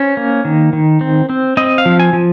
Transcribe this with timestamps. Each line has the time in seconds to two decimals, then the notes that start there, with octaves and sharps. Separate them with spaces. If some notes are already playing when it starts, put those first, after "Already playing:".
Already playing: C#4 C5
0.17 A#3
0.45 D#3
0.73 D#3
1.01 C4
1.29 C4
1.57 C4 D#5
1.78 F5
1.86 F3
2.00 G#5
2.13 F3